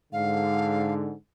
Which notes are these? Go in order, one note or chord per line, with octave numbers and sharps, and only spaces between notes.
G#2 D3 F5